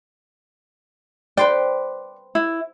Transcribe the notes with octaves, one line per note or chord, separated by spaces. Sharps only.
B4 C5 D5 G5
E4